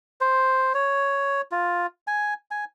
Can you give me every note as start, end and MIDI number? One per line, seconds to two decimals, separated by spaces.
0.21 0.73 72
0.74 1.41 73
1.51 1.86 65
2.07 2.34 80
2.51 2.65 80